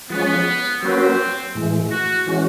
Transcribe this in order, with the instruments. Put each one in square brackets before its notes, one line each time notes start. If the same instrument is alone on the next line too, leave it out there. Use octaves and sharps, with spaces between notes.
[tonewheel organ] F3 G#3 C#4 [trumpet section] B3
[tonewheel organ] F#3 A#3 C#4 F#4 B4 [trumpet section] C4
[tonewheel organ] A2 E3 G#3
[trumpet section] F#4
[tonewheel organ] E3 G#3 C#4 F#4